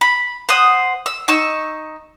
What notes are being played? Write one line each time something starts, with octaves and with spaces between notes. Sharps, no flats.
B5
C5 F#5 D#6
E6
D#4 C#6 E6